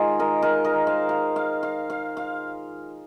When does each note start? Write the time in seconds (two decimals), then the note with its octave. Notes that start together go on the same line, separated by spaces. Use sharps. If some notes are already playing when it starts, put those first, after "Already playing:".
Already playing: D#3 G#3 D#4 F4 G#4
0.19 A#4 D#5
0.42 A#4 D#5
0.64 A#4 D#5
0.87 C5 F5
1.09 F5
1.36 F5
1.63 F5
1.90 F5
2.17 F5